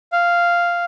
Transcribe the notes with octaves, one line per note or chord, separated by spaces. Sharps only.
F5